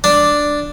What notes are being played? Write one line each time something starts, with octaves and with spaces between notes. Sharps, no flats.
D4